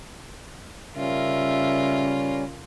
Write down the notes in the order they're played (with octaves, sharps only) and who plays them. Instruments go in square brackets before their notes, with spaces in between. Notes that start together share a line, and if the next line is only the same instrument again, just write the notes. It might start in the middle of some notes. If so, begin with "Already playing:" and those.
[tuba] C#3 [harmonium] G3 C#4 [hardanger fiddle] F4 A#4 [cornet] E5